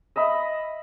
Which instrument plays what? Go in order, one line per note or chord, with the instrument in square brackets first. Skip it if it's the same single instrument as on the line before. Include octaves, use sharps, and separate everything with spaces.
[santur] D#5 E5 B5